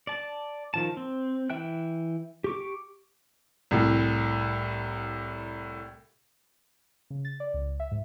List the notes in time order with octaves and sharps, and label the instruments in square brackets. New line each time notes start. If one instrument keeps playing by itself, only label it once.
[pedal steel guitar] D5 A5
D#3 F3 A5
C4
E3 E5 G5 F#6
G4 C#6 D6
[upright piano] C2 A2
[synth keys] C#3
A6
D5
C#2
E5
G#2